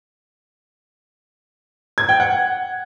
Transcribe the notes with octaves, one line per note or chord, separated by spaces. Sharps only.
G#6
G5
F#5